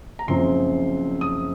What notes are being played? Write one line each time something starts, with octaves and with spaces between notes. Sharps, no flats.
A#5
F#1 F#2 F3 C4 C6
D#6